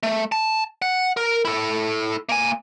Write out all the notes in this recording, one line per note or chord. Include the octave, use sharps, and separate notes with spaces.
A3
A5
F#5
A#4
E4 A4
A#3 G#5